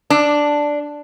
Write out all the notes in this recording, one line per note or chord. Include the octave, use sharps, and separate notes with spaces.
D4